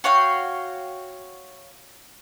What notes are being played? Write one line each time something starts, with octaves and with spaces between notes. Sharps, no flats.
F#4 C#5 F5 G5